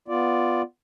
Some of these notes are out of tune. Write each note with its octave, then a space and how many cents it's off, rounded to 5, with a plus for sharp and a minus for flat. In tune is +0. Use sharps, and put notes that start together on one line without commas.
B3 +0 F4 +0 D5 +0